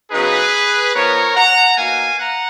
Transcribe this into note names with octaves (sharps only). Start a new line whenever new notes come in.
C#3 F#3 B3 D#4 G#4 B4
F3 B3 D#4 A#4 C#5
F#5 A#5
B2 A#3 D#4 F5 G#5
F#5 A#5